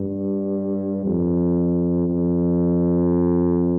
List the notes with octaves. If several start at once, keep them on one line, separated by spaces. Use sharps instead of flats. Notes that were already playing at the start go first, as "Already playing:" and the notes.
Already playing: G2
F2
F2